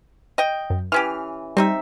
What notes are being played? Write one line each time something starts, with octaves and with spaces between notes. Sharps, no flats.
D#5 G5
F#2
E3 C#4 G4 F6
G3 C4 D#4 E5